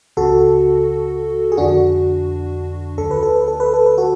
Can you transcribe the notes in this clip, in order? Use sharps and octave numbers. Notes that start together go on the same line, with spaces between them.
C#2 C#3 F#4 A4
G#4
F2 D3 D4 F#4
D2 D3 A4
B4
A4
B4
A4
B4
A4
B4
F#4 A4